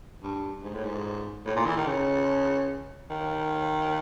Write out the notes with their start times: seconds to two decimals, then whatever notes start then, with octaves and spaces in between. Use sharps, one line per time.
0.23 G2
0.63 G#2
0.74 A2
0.84 G#2
1.46 A2
1.56 A#2
1.66 E3
1.77 D#3
1.87 C#3
3.10 D#3